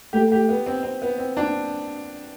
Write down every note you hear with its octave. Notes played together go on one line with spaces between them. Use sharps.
A3 G4
G4
B3
C4
C4
B3
C4
D4